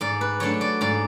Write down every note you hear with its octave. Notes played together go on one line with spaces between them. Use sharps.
G#2 D5
B4
F#3 A3 D4 C#5
D5
G#2 D5